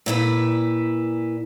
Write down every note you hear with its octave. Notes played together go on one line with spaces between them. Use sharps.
A#2 E4 B4